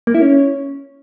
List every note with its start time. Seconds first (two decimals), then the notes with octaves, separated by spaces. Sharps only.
0.07 A#3
0.14 E4
0.22 C#4